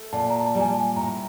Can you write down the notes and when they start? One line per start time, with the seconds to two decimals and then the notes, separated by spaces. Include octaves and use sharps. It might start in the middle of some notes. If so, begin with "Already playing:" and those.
Already playing: A3
0.13 A#2 A5
0.30 A#5
0.40 A5
0.55 G3
0.61 G#5
0.69 A5
0.96 A2 A#5